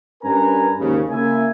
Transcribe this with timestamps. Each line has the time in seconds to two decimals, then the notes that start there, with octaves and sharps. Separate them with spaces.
0.23 G2 C#4 A#4 B4 G#5 A#5
0.79 D#2 G#2 C#3
1.10 C#3 A#3 C#4 E4 E5 G#5